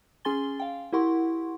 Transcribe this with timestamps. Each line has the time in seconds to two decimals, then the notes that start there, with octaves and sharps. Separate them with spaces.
0.25 C#4 G#4 G#5 C6 A6 G7
0.60 F5 G5
0.93 E4 G4 A#4 F#5 C6 C#6